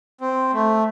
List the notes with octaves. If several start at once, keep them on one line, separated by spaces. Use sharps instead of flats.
C4
A3